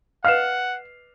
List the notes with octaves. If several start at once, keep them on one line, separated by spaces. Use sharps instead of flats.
B4 D#5 F5 F#5 F6 C7 E7